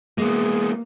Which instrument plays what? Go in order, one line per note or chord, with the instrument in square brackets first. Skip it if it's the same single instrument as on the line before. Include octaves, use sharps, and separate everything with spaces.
[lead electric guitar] G#3 B3 [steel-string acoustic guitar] A#3 [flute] G#4